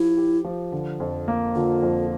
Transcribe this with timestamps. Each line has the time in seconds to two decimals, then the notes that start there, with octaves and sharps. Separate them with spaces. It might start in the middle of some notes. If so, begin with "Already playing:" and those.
Already playing: F3 E4 G4
0.17 G4
0.44 F3
0.72 D3
1.00 F2
1.28 A#3
1.55 D3 F4
1.83 F2